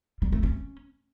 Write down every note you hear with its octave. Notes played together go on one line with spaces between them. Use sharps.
G3
A3
C#4